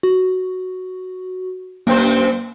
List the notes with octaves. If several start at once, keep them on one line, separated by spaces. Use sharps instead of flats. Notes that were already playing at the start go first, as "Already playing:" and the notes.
F#4
F#2 A#3 C4 C5